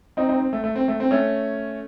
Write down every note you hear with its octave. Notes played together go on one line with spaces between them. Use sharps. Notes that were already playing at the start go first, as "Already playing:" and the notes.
C4 D#4
C4 D#4
C4
A3
A3
C4
A3
C4
A3 C#4